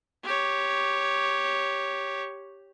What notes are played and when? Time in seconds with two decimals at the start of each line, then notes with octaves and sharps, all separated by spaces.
0.24 G4 C#5